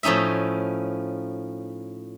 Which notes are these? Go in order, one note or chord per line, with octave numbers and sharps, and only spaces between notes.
A2 F3 C#4 D#4 E5